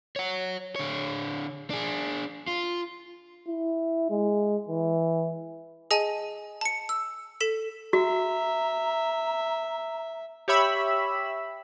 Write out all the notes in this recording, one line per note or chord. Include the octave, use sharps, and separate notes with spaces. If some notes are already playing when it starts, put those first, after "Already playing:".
C#5 F#5
D3 C#5
D4 G#4
F4
E4
G#3
E3
G#4 D#5 G#5 A5 D#7
A5 C#7
E6
A4 B6 E7
F#4 E5 A#5
G4 C#5 E5 B5 E6